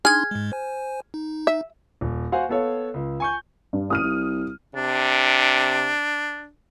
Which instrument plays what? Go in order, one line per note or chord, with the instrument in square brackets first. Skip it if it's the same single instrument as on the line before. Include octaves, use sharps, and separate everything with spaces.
[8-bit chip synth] D4 D#4 C6 [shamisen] G#4 [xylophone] F6 G#6
[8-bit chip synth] G#2 G#3
C5 G#5
D#4
[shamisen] E5
[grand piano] D#1
F#4 C5 F5 F#5 G#5
B3 A4 C#5 F5
C#2
G#5 C#6 G6
[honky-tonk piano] G2
[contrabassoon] A1 [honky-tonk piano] D#6 F6 D#7
[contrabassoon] C2
[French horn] C3 [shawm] D4